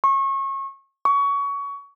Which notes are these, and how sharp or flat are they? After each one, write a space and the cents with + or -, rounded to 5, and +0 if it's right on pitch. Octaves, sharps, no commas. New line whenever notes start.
C#6 -30
C#6 +25